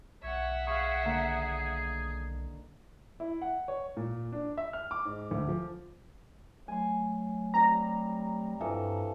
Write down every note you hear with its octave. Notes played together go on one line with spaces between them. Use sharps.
B1 C#5 E5 F#5
G#4 F5 C#6
D3 D#3 A#3
E4
F#5
C#5
A#2
D4
E5
F6
D6
G#2
D2
F3
F#3 A3 G#5 C6
G3 C4 A#5
G2 E3 F3 A4